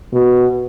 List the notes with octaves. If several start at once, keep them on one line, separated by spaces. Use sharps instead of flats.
B2